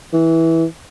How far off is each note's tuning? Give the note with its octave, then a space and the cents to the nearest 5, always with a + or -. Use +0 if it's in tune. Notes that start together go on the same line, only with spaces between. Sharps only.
E3 -10